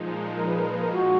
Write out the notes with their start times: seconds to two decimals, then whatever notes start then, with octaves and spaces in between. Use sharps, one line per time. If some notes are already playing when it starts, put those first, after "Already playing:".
Already playing: A#2 F3 G#3 D#4
0.36 A#4
0.47 B4
0.57 A#4
0.70 B4
0.81 A#4
0.92 F#4